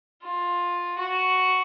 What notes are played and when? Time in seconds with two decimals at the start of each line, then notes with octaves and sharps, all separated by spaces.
0.23 F4
0.98 F#4